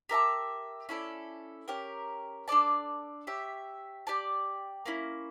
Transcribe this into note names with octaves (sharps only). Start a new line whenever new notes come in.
G4 A#4 E5 A5
C#4 E4 A4 D5
C#4 G4 A#4
D4 A4 D5 A5
G4 C#5 E5
G4 D5 A5
A#3 C#4 E4